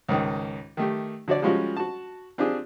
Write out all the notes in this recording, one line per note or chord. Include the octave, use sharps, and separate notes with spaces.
C#2 G#2 D#3
D#3 A3 G4
D3 F#4 C#5 D5
F3 G3 G#3 C#4 F4 F#4
F#4 A5
C4 D4 F4 G4 G#4